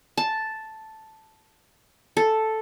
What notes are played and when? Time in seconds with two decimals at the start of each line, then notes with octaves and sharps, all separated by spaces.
0.17 A5
2.17 A4